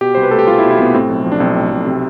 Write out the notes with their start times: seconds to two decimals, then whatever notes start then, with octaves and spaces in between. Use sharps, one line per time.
0.01 B2 G4
0.15 C2 C5
0.23 B4
0.31 A3 A4
0.39 G4
0.47 C2 F4
0.58 E4
0.63 B2
0.71 E4
0.78 C2 B3
0.94 A2 C4
1.09 B1
1.24 F3
1.32 D4
1.40 B1 C4
1.55 A2
1.71 B1
1.87 C3